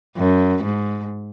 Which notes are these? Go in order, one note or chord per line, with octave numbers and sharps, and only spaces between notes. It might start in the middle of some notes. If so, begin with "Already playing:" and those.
F#2
G#2